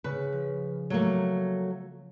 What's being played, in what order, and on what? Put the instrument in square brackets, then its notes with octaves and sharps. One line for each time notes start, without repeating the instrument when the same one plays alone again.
[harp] C#3 [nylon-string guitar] B4
[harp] F3
[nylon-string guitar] F#3 A3 A#3